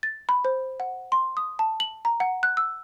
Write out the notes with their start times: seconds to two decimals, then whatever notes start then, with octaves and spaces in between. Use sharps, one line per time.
0.03 A6
0.29 B5
0.45 C5
0.80 F#5
1.12 C6
1.37 D#6
1.59 A5
1.80 F#7
2.05 A#5
2.20 F#5
2.43 F#6
2.57 E6